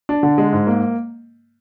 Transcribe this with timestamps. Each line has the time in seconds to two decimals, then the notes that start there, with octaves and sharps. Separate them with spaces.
0.09 D4
0.23 D3
0.38 G#3
0.53 G#2
0.67 A#3